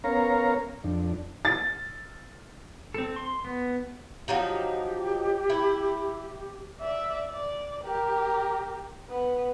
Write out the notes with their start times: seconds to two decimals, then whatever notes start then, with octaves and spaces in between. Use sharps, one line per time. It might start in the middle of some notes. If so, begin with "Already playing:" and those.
0.04 B3 C#4 A#4 C#5 F5 A#5
0.84 F2 D4
1.45 A6
2.94 C4 A4
3.16 C6
3.45 B3
4.28 F3 F#3 D#4 G4
5.50 E4
6.81 D5 E5
7.29 D5
7.84 G4 A#4
9.10 B3